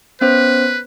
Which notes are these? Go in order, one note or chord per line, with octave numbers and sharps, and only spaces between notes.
B3 C#4 B4 C5